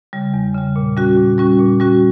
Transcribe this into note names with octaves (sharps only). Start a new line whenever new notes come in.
C#3 G3
E2
C#3 G3
A#2
G3 C#4 F#4
A#2
G3 C#4 F#4
A#2
G3 C#4 F#4